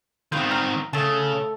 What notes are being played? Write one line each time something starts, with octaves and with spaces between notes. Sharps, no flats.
D#3 B3 C4 F4 G6
A#5 F6
C#3 A3 A5